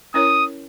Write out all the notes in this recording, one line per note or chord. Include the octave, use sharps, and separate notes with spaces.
C#4 E4 A#4 C#5 D#6